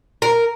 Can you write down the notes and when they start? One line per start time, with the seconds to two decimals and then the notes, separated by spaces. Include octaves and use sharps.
0.22 A#4